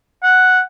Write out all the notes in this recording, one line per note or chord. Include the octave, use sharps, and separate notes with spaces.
F#5